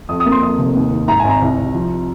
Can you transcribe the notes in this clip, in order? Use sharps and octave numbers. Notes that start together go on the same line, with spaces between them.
F2 D#6
D#6
A#3
C6
F2 D#6
F1
D#2
D#3
G#2 A#5
G#1 G#5
A#5
C2
C2
F3